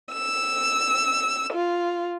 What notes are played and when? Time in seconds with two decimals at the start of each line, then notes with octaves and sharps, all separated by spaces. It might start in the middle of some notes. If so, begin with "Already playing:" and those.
0.13 E6
1.53 F4